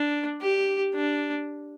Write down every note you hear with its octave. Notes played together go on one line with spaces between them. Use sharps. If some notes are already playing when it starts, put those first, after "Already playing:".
Already playing: D4
G4
D4